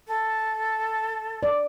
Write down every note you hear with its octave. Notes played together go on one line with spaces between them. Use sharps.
A4
D5